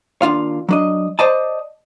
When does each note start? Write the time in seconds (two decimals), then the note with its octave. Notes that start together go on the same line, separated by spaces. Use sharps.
0.22 D#2 D4 F4 F5
0.69 F#3 D4 D#5
1.19 C5 D5 D#5 A5